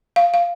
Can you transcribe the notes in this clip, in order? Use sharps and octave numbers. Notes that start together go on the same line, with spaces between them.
F5
F5